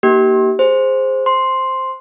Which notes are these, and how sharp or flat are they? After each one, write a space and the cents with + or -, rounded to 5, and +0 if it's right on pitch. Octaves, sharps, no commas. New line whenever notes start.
A#3 +0 D#4 +0 G4 -25
G#4 -5 C5 +0
C5 +0 C6 +0